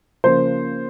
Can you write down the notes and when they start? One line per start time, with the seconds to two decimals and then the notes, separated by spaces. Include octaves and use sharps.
0.24 C#3 F3 A#3 C5